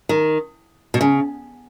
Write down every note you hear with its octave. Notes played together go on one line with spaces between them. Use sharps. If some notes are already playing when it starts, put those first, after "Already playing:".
D#3
B2
C#3